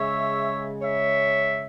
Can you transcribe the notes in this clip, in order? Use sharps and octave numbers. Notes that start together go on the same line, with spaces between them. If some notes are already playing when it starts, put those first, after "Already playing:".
Already playing: C#3 G#3 C#5 E5
C#5 E5